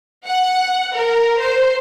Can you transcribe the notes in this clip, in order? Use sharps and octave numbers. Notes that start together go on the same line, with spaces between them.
F#5
A#4
C5